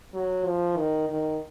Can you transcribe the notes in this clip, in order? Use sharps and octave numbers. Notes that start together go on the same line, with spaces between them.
F#3
F3
D#3
D#3